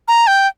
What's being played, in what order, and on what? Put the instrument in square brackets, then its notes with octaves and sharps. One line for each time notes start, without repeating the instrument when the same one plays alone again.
[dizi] A#5
G5